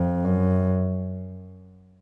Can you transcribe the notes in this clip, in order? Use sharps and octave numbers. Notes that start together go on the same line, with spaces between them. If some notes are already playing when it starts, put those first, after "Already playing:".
Already playing: F2
F#2